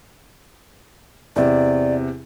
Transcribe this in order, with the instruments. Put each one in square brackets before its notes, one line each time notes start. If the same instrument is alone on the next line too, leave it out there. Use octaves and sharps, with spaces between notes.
[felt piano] E2 C3 [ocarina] D5